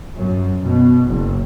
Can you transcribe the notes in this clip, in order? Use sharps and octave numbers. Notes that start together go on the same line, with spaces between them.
F#2
B2
F#1